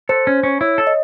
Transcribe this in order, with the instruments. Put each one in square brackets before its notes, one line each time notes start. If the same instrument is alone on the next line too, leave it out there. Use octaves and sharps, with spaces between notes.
[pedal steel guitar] A4 [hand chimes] C5
[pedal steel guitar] C#4
C#4
[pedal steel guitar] E4 [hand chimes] C#5
[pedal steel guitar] A4
[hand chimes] D#5